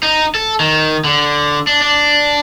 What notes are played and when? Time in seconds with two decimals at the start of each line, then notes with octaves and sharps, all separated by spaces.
0.03 D#4
0.35 A4
0.60 D#3
1.04 D3
1.67 D4
1.82 D4